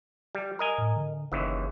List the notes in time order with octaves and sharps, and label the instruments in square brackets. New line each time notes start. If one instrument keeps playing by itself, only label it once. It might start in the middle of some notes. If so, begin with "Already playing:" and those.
[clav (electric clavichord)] G3
A#4 D#5 G#5
[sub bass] A2
D3
[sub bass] F#1 [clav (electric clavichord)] D#2 C#3 E3